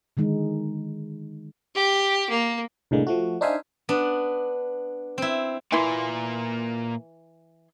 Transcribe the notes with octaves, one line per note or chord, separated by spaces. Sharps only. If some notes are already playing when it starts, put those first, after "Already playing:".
D3 D#3 G#3 D#4
G4
A#3
C2 A2 D3 G#3 A#3
F3 A3 F#4
D4 D#4 C5 E5 F5 G#5
B3 D4
C4 E4
A#2 E3 A#3 E4 C6